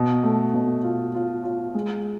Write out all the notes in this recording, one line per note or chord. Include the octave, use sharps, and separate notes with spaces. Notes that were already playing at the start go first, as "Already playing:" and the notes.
Already playing: B2
A3
B2
F4
F4
F4
G#3